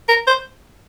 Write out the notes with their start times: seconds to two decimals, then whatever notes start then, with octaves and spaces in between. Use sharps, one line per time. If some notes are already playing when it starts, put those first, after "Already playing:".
0.09 A#4
0.27 C5